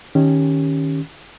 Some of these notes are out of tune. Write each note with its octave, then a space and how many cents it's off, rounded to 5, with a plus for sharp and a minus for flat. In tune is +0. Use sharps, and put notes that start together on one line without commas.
D#3 +0 C#4 +0 G4 +0